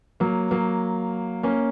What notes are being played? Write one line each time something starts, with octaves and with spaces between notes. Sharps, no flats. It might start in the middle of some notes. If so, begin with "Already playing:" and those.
F#3 A#3
F#3 A#3
A#3 C#4